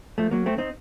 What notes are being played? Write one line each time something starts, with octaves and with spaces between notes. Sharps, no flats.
F3 A3
F#3 A#3
A3 C4
C4 D#4